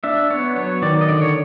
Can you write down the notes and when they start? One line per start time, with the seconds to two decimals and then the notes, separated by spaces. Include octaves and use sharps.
0.04 D4 E5
0.30 B3 C#5
0.56 F#3 C#5
0.82 D#3 D5
1.01 D#5
1.08 D3 D5
1.21 C#5